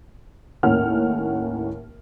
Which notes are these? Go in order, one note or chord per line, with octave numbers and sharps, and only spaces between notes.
D#2 A2 C#4 A#4 F#5 F6